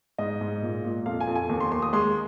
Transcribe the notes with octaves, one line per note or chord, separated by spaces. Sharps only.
G#2 D#5
G#2
A#2
A#2
F2 F5
G#5
F2
G#5
D#2
C6
D#2 C6
D#6
G#3 C6